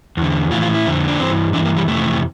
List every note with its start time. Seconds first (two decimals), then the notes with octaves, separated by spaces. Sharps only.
0.17 E2 D3
0.51 A2 E3 F4
0.62 F4
0.74 E4
0.86 F2 D3
1.08 D4
1.20 G2 E3 C4
1.53 G2 E3 D4
1.65 A#3
1.77 G3
1.88 F2 C3 E3 A3